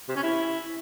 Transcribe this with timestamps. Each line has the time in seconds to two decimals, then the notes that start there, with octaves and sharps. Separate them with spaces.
0.09 C3
0.16 C#4
0.23 E4